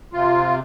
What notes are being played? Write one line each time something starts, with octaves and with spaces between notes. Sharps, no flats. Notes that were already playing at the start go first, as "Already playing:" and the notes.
C3 F4